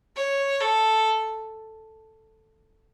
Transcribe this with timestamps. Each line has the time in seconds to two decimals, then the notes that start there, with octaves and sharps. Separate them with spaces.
0.16 C#5
0.61 A4